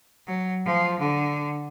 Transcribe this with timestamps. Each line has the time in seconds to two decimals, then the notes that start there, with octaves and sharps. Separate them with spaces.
0.27 F#3
0.65 F3
0.99 D3